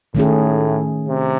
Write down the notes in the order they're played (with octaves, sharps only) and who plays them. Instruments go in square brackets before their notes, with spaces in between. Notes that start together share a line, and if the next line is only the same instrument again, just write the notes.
[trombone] A2 [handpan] D#3 A3 C#4 G#4
[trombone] C3